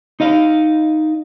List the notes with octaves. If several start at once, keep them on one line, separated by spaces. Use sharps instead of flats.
D#4 D#5 F5